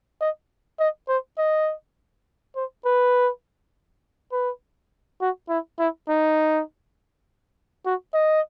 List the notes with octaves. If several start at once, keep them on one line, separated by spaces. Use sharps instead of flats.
D#5
D#5
C5
D#5
C5
B4
B4
F#4
E4
E4
D#4
F#4
D#5